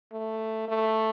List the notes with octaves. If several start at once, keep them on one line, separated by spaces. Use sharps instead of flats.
A3
A3